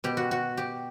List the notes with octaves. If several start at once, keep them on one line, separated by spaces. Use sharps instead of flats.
B2 G4
F#4
F#4
G4